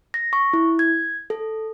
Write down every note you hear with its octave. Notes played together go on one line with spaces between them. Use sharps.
A#6
C#6
E4
G#6
A4